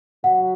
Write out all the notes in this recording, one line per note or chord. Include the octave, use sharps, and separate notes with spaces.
F#3 F#5